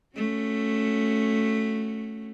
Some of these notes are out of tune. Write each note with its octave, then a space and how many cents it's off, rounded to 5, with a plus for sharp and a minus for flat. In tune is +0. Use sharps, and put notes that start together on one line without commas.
A3 +0 C#4 +0 F#4 +0